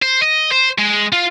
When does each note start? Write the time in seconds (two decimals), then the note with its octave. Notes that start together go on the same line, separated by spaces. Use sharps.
0.02 C5
0.22 D#5
0.51 C5
0.78 G#3
1.12 F4